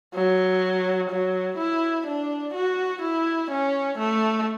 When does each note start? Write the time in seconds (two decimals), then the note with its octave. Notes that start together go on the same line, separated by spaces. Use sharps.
0.14 F#3
1.10 F#3
1.58 E4
2.07 D4
2.54 F#4
3.02 E4
3.51 C#4
3.99 A3